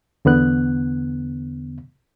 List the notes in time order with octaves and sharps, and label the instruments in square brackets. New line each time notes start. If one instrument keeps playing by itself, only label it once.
[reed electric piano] E2 D3 B3 F#6